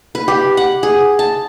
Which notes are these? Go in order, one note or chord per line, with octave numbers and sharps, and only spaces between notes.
B4
G4
F#5
G#4
A5